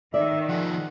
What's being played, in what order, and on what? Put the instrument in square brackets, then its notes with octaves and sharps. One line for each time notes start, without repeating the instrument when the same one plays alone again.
[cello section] D#3 [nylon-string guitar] D5 [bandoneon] E5
[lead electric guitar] F3 G#4 [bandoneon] F#5